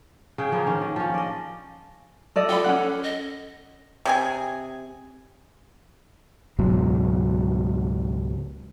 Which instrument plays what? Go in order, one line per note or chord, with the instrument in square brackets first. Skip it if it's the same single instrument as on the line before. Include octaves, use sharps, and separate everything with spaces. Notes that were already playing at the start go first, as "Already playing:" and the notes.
[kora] C#3 G#4 G5
F3 A#3 G#4 C5
D#3 C#4
D#3
F3 C#4
D5 D#5
[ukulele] A4 D5 D#5
[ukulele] G4 B5 [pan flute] A4
[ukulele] C#4 D4 F#5
[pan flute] D#5
[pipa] C3 G#4 G#5
[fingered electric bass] C#2 G#2 B2 F#3